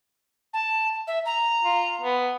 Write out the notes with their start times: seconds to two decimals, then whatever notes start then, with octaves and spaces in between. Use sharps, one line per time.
0.53 A5
1.07 E5
1.26 A#5
1.64 F4
2.01 B3